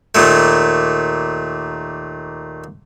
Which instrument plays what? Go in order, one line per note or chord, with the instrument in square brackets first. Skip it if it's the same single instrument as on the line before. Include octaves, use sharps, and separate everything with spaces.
[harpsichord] D#2 A#2 A3